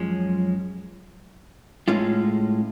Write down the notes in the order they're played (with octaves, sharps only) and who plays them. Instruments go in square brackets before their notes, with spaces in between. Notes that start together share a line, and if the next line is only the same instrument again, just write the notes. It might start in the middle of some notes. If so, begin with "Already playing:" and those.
Already playing: [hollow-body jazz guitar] F#2 F3 G#3 C#4
A2 G#3 C#4 F4